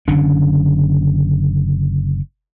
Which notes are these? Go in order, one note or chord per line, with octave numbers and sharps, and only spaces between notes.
F#1 D3 C#4 D4